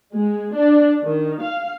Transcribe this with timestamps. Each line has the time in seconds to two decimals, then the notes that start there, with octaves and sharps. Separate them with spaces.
0.14 G#3
0.56 D4
1.04 D#3
1.41 F5